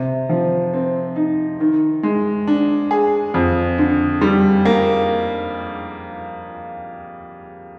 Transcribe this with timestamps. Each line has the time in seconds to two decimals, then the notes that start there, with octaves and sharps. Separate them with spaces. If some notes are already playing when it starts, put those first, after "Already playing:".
Already playing: C3
0.29 F3
0.74 C4
1.16 D#4
1.60 D#3
2.03 G#3
2.47 D4
2.91 G#4
3.34 F2
3.78 D3
4.21 G3
4.65 A#3